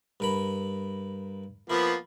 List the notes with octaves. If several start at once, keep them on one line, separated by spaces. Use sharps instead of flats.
G2 A#4 B5
F3 A#3 B3 E4